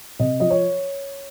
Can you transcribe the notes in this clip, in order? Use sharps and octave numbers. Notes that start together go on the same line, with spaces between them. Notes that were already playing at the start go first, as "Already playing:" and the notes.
C3 D#5
F3 D#5
C#5